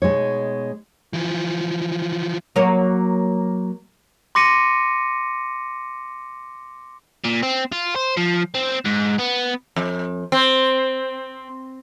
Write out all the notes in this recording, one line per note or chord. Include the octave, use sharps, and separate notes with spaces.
B2 G#3 D#4 C#5
E3 F3
F#3 A#3 C#5
C6 D6 A#6 C#7 D#7
A#2
C4
F4
C5
F3
C4
G#2
B3
F2
C4